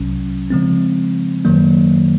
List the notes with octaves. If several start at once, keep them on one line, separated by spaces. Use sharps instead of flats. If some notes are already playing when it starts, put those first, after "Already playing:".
Already playing: C2 C3 F#3 C#4
C#3 F3 G#3 C4
F#2 D#3 F#3 A#3